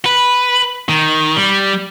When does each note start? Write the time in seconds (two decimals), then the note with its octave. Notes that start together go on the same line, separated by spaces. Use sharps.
0.06 B4
0.89 D#3
1.36 G3